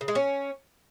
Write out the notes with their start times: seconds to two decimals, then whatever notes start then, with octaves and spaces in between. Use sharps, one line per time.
0.01 C#3
0.08 G#3
0.15 C#4